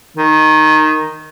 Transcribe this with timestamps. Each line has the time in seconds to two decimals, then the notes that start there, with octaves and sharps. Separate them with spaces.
0.17 D#3